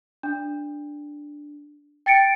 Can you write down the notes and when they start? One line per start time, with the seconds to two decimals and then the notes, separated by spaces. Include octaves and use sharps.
0.23 D4
2.06 G5 A6 C#7 D7